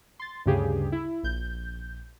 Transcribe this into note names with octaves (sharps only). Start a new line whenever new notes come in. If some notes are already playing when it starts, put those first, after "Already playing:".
C6 A6
D2 G2 C#3 G4 G#4
E4
A#1 G6